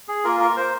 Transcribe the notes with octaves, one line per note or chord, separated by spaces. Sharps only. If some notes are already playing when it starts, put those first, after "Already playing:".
G#4
A#3 F4 A#4
A#4
C5